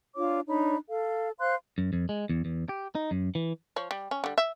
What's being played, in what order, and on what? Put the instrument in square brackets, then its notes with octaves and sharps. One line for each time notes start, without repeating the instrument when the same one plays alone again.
[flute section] D4 F4 C#5 D6
D4 D#4 C#5 B5
A4 F5
C5 F5 C6 F#6
[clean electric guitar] F#2
F2
G#3
E2
E2
G4
D#4
F#2
E3
[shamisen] F3 C#5
G3
C#4
D3 G3
E5